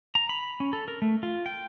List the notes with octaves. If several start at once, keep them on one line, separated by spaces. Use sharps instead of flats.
A#5
B5
C#4
A4
A#4
A3
F4
G5